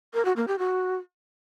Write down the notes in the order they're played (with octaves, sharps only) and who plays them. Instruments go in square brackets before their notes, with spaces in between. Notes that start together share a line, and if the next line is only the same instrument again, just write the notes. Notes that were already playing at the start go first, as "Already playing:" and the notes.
[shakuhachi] A#4
F#4
A#3
G4
F#4